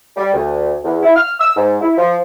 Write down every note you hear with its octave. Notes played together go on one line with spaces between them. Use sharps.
G3
D2
E2
E4
F6
E6
G#2
E4
F3